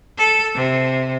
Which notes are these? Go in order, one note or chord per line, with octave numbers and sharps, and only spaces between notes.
A4
C3